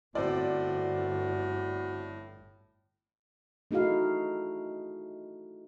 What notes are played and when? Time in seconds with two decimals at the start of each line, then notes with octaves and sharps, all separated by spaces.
0.15 G1 A2 C4 F#4 D5
3.71 A3 D#4 E4 F#4 G#4 F5